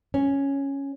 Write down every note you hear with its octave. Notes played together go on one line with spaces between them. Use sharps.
C#4